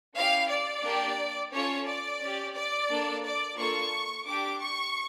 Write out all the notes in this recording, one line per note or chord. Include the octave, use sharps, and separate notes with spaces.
C#4 E4 G4 F5
D5
A#3 D4 G4
C#4 F4 A4 C#5
D5
C#4 G4
D5
A#3 D4 A4
D5
A#3 D4 F4 A4 C#6
D4 G4 D6
C#6